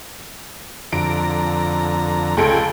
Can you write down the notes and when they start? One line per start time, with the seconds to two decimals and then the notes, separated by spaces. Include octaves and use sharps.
0.93 F2 D3 A#5 D7
2.37 C#2 A4 G5 G#5 D7